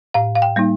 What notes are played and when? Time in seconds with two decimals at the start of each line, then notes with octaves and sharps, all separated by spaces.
0.14 A2 F5
0.35 F5
0.42 G5
0.56 G3 A#3 D#4